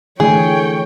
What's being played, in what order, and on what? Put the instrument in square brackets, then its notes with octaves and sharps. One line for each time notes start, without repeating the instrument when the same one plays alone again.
[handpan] D3 E3 A3 [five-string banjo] G#4 [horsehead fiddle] C#5 G5